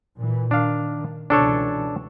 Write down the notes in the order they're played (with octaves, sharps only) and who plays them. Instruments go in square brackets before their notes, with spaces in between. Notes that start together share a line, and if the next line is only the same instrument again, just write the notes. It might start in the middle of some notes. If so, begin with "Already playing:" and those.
[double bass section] A#2 E3
[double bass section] D#3 [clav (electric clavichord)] D4 F5
[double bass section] C#2 B2 E3 [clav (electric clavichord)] D4 A4 C#5